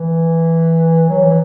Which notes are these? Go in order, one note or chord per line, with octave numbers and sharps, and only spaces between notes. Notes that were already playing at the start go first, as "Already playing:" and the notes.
Already playing: E3
F#3
E3